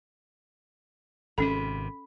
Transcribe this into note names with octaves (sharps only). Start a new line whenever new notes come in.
G#1 C3 C#4 A4 B5